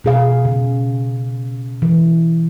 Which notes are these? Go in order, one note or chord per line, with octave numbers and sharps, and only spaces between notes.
B2 G#4 F5
C#3
E3